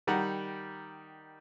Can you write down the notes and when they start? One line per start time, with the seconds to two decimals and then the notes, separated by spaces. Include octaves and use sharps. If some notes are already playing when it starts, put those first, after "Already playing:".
0.07 D#3 G3 D#4 F#5 A#5